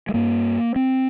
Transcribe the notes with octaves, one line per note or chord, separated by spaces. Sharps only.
G#3
G2 A#3
C4